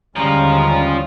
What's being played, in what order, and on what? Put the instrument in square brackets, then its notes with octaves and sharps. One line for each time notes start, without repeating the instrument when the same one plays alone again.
[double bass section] D#2 D3 [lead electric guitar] F3 F4 [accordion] G3 G#3 C#4 [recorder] A#5